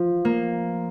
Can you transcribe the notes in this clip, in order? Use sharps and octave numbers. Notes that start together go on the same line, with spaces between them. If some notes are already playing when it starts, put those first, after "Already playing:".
Already playing: F3
A#3